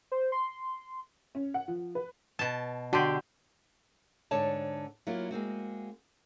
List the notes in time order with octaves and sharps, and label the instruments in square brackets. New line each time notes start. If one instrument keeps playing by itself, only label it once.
[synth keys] C5
C6
[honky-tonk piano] C#4
F#5
F3
B4
[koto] B2 A5
[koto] D3 G4 [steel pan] F#4 A5 C6
[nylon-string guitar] G#2 D3 C#5 D5 A5
F#3 A#3 E4 F4
G#3 A#3 C4 F#4